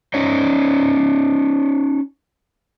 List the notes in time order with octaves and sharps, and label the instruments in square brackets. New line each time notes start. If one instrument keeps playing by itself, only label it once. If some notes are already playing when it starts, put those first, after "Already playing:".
[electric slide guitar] C#4 D#4 C#5 D#5